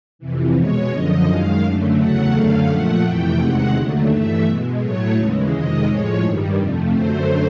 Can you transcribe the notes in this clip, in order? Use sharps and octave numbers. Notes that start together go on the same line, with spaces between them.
F2 C3 E3
B2 G#3 C#5
F#2 D3 F3 D#5
F#2 D#3 G#3 F5
F#2 D3 F#3 A3
E2 C#3 F#3 A3 F#5
F#2 D3 F#3 A3 F5
A#2 F3 A3 F#5
F2 C3 E3 A3 G5
E2 C3 D#3 G#3 F#5
D#2 D3 F#3 A3
G2 E3 A3 E5
B2 G#3
A2 F#3 A3 C#5
D#2 C#3 E3 G#3
F2 C3 D#3 G#3 D#5
A2 F3 G#3 C#5
G2 D#3 G3
F2 C3 F3 A3
F#2 D3 F#3 A3 C5